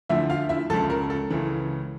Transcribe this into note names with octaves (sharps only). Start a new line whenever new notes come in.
D2 D3 F3 E4 E5
F4 F5
E4 E5
C#2 C#3 F3 A4 A5
A#4
A4
C#2 C#3 E3